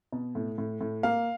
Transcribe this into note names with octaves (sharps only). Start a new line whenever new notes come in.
B2
A2
A2
A2
A#3 F5